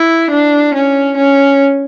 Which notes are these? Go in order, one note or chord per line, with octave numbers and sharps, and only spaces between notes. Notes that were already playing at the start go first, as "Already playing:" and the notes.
Already playing: E4
D4
C#4
C#4